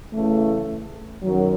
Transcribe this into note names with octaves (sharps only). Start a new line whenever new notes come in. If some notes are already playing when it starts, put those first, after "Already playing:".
C#3 E3 A3
F#2 D#3 F#3